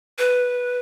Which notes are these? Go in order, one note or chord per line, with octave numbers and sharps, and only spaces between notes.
B4